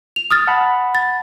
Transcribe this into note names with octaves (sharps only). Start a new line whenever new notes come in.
F7
D#6 F6 A6
F#5 A5 B5
A6